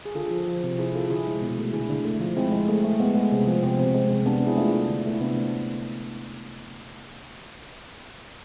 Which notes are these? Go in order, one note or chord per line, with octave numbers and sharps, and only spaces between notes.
G#4
D3 F4 A4
F3
F3
C3
C3 E4 G#4
C3 F4 A4
D3 E4 G#4
G#3
B2
A3
D3 E4 G#4
D3
A3
F3
G#3 C4 E4
G#3
A3
A3
G#3 B3
G#3
C3
F3
C3 C4
C3
G#3
C3
C3 B3 D4
C3 E4 G#4
A3 D4 F4
A3
D3
A3
E4
C3 B3 D4
A3